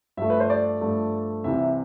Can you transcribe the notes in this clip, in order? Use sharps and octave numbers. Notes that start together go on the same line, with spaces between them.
G2 F3 A3 E5
B4
C5
D5
G2 F3 A3
C2 C3 E3 E5